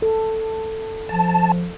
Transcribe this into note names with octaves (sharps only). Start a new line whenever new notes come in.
A4
F3 A5